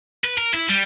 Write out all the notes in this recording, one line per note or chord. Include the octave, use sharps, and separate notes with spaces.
B4
A#4
E4
G3